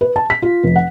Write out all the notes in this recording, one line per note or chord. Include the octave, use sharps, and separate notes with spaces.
B4
A5
B6
F4
F1
F#5